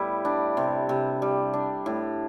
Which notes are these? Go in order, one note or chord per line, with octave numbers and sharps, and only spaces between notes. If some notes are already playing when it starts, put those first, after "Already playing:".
Already playing: A2 G3 B3 E4
D4
C3
C3
G3
D4
A2